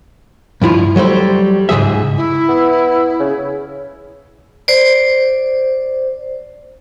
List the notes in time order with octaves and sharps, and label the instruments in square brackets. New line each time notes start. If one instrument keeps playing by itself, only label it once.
[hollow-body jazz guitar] G2 F3 E4 F4
F#3 G3 A3 C5
C#2 G#2 C#3 G#4 E5
[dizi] E4
[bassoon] B3
C#3
[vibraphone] C5 D5